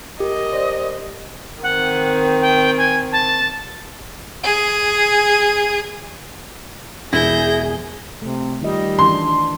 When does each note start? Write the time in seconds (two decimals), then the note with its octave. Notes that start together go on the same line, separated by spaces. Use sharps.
0.20 G4 A#4 D#5
0.52 C5 D5
1.63 D#3 C4 F#5
2.42 G5
2.77 G#5
3.12 A5
4.43 G#4
7.13 E1 E4 G#4 G6 A#6
8.22 C3 A3
8.62 D#3 G3 F4 D#5
8.99 D#3 E3 D4 C6